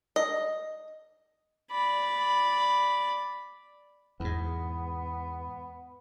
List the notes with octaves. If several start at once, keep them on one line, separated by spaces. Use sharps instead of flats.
D#5
D5 B5
E2 G#2 B3